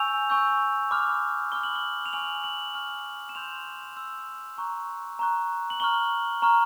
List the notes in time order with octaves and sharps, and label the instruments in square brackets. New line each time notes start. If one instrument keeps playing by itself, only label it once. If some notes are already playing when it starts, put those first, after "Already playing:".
Already playing: [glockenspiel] G#5 C#6 E6 G6 F7
G#5 C#6 E6 G6
B5 D6 F6
B5 D6 F6 G7
F#7
G7
F7
G#5 C#6 F6 F#7
F#7
G#5 C#6 F6
E7
C6 E6 G6 F7
C6 E6 G6
A#5 C#6 F#6
A#5 C#6 F#6
F#7
A#5 C#6 F6 G7
A#5 C#6 F6